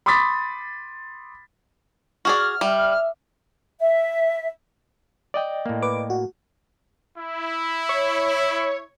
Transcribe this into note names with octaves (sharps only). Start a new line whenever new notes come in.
B5 C6 D6 D#6 A6 B6
F#4 G#4 D5 F6
G3 E5
E5
D5 D#5 G5
A2 A#3
B4 D6
F#4
E4
C#5